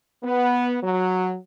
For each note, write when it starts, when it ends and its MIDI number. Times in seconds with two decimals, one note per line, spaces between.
0.24 0.78 59
0.83 1.35 54